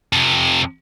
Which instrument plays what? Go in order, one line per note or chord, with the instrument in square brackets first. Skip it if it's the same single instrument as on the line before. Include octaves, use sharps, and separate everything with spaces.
[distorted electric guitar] F2 C3